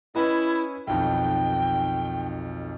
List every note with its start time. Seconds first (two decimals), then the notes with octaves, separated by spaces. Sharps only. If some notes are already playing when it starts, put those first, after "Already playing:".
0.15 C#4 E4 B4 D#5
0.87 B1 F2 D#3 G5